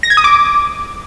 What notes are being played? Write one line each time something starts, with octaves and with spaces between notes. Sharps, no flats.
A#6
G#6
D#6
D6